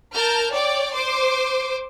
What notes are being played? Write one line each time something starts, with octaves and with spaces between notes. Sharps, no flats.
A#4 A5 F6 G6
C#5 D5 G5 D6
C5 C6 D6